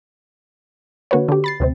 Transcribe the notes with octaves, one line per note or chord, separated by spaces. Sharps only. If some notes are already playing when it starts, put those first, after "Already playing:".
D3 A#3 F#4 B4 C#5
D3 G4
B5 A6 C7
D2 C3 C4